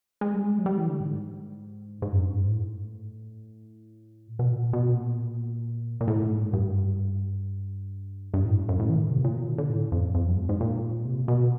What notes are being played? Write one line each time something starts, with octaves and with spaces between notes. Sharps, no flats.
G#3
G3
G#3
F#3
G3
E3
D3
G#2
G#2
F#2
G2
G#2
A2
A#2
B2
A#2
B2
A#2
A#2
A2
G#2
G2
G2
A2
F#2
A2
E3
D#3
C3
A#2
B2
D#3
D3
A2
F2
F2
F#2
G#2
G#2
A#2
C3
A#2
B2